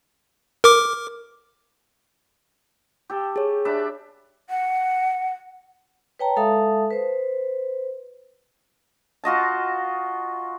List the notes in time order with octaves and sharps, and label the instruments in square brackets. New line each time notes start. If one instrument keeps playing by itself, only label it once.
[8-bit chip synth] A#4 D6
[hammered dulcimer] G4 A4
[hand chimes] G#4 C#5
[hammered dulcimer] D4 E5 B5
[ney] F#5
[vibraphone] B4 C#5 G5 A5 A#5
G#3 A4 E5 F5 A5 D#6
B4 C5
[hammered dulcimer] F4 F#4 D#5 A5